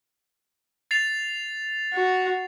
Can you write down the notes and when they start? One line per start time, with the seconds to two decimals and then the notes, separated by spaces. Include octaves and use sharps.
0.91 A6 C7 F7
1.94 F#4